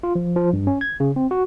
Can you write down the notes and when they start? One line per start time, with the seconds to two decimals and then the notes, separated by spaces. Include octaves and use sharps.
0.03 F4
0.15 F3
0.36 F3
0.53 G2
0.67 C#4
0.81 G#6
1.00 C#3
1.16 C4
1.31 F#4